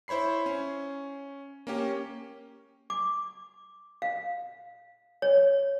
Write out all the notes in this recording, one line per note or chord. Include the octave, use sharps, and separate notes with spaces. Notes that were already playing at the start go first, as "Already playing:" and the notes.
E4 C5 C#5 B5 C7
C#4
A#3 C#4 G4
D6
F5
C#5